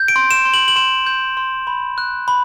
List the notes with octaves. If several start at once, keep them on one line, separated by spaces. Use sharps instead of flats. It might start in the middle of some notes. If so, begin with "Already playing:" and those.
Already playing: G6
D7
C6
E7
C6
F#7
F#7
C6 E7
G6
C6
B5
F#6
B5